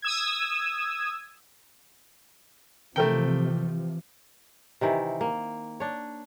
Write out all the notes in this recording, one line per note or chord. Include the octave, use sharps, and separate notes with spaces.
D#6 E6 G#6
C3 E3 F3 A3 A#4 G5
C3 D#3 E3
A#3
D4 C#5